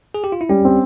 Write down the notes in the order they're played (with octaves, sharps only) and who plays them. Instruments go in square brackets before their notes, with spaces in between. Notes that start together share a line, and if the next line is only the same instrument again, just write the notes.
[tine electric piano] G#4
G4
F4
E4
[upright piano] G3 [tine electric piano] C#4
[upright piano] C4